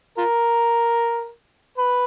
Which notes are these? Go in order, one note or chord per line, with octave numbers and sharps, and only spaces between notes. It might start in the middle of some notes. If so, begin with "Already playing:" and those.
F4 A#4
B4